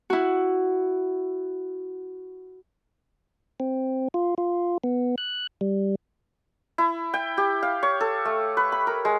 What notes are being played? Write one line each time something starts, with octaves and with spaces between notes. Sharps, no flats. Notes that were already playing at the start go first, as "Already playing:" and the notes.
E4 F#4
C4
F4
F4
B3
F#6
G3
E4
G5
G4
F5
C#5
A4
A3
B4
B5
A#4
G#3